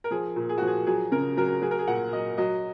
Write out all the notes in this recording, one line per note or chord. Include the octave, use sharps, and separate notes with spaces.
A#4
F3 G#4
A#2
G#4
F3 F#4
G#4
F#3 G#4
C#3 A#4
F#3 A#4
F#3 G#4
A#4
G#4
A#2 F#5
F#3 D#5
F#3 D#5